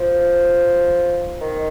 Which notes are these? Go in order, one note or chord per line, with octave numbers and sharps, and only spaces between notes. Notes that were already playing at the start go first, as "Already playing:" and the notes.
Already playing: F3
D#3